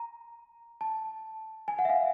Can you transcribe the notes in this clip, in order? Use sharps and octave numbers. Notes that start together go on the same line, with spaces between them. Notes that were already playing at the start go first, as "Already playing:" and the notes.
Already playing: A#5
A5
G#5
F#5
E5
F5